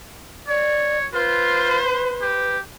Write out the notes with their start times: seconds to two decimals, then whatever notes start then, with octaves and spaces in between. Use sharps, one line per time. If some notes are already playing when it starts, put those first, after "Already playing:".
0.48 C#5 D5
1.13 F4 B4 C5
2.22 G4